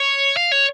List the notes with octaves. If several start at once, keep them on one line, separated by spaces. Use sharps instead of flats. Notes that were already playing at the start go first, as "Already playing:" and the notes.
Already playing: C#5
F5
C#5